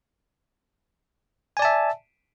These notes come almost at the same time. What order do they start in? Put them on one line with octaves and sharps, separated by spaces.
G#5 D5 A5 E5